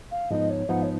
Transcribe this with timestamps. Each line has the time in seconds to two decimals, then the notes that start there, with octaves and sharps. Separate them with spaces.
0.11 F5
0.31 G#2 F3 B3 D#4 D#5
0.50 C#5
0.69 G#2 F3 B3 D#4 F#5
0.83 C#5